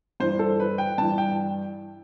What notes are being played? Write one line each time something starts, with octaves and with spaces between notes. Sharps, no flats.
G2 E3 C5
A4
B4
G5
G2 E3 A5
G5